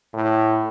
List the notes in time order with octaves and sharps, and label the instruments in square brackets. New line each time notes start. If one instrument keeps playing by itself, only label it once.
[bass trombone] A2